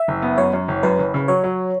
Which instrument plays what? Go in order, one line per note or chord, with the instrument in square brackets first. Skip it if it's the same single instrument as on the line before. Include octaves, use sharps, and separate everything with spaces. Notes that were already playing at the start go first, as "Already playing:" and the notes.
Already playing: [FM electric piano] E5
[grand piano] F#1
B3
[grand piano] F#2 [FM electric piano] C#5
[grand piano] F#2
F#1
[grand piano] F#2 [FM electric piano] B4
[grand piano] F#1
C#3
[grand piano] F#3 [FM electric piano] C#5
[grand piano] F#3